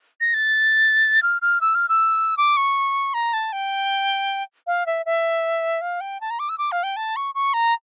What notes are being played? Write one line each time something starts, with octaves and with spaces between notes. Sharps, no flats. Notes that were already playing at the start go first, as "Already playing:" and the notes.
A#6
A6
F6
F6
E6
F6
E6
D6
C#6
A#5
A5
G5
F5
E5
E5
F5
G5
A5
A#5
D6
E6
D6
F5
G5
A5
C#6
C#6
A#5